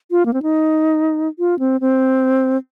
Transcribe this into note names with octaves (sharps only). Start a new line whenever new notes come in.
F4
A#3
C4
D#4
F4
C4
C4